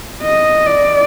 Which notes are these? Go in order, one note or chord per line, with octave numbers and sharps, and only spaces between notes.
D#5
D5